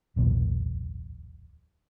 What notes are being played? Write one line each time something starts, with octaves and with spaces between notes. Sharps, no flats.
D1 B1 E2 A#2